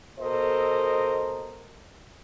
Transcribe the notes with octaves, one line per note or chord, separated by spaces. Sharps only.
B2 A4 A#4 C5 D#5